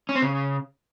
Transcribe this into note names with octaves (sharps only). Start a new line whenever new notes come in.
C#4
C4
C#3